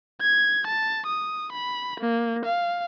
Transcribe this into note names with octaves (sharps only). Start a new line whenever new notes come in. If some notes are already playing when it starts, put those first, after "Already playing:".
G#6
A5
D#6
B5
A#3
F5